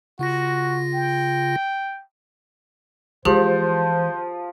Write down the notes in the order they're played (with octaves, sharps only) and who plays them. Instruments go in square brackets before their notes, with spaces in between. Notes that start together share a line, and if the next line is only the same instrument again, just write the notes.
[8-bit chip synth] C#3 F4 A#6 [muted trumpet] F#4
[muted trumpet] G5
[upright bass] E3 G#3 [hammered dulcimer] F3 [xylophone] G4 G#4 [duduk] C5